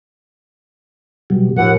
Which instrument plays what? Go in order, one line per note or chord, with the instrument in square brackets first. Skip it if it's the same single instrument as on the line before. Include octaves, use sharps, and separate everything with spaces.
[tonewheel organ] B2 F#3 G3
[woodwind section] D#2 F#5 [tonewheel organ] A2 F3